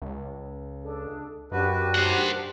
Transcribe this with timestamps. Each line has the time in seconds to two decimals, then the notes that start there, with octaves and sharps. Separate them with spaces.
0.02 C#2
0.82 D4 G#4 A4
1.52 F#2 D4 F#4 G4 A#4 B4
1.95 C5 F#5